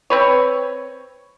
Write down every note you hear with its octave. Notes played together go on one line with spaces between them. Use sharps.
C4 B4 C#5